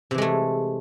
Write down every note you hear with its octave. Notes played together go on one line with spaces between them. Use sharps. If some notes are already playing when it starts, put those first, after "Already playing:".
C3 E3 G#3 A3